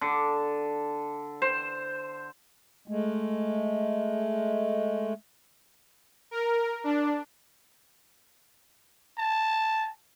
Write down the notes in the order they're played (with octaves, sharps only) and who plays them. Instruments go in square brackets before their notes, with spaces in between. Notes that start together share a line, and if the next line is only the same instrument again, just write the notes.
[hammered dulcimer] D3
C5
[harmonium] G#3 A3
[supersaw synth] A#4
D4
[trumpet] A5